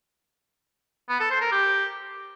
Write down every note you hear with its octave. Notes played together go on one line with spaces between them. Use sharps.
B3
A4
C5
A#4
G4